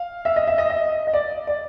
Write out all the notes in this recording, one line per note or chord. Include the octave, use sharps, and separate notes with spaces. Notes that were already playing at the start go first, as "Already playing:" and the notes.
Already playing: F5
E5
D#5
E5
D#5
D#5
D#5
D5
D5